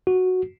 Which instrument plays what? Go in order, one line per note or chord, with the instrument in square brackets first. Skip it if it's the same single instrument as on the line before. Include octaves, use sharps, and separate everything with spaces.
[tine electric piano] F#4